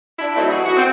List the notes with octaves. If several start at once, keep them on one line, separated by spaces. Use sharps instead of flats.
D4 E4
F#3 A3 C4 D#4 E4
E3 F#4 G#4
F#4
C4